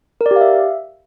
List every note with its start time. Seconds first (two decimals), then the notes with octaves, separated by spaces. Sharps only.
0.21 A#4
0.26 D5
0.31 G4
0.36 F5
0.41 E5